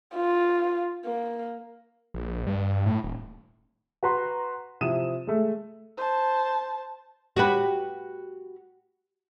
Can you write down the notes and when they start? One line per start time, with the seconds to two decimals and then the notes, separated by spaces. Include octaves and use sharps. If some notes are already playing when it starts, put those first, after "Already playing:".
0.15 F4
1.05 A#3
2.14 A#1
2.47 G2
2.86 A2
3.04 D#1
4.03 F#4 B4 A#5 C6
4.81 C3 F3 E4 D#6 D#7 E7
5.27 G#3 A3
5.97 C5 A5
7.36 F#4 G4 B4